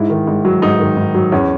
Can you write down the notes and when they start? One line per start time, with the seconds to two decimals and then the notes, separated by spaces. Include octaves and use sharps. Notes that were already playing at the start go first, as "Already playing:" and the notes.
Already playing: G#2 E4
0.10 D#3
0.27 G#2
0.45 F#3
0.62 G#2 D#4
0.80 D#3
0.97 G#2
1.15 F#3
1.32 E2 C#4